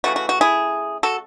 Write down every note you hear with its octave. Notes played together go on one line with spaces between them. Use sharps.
C#3 E3 A3 F#4
F#4
F#4
E4 G#4
F#4 A4